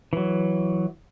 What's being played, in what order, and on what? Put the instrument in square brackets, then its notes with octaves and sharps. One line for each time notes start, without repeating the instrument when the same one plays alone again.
[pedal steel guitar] E3 F#3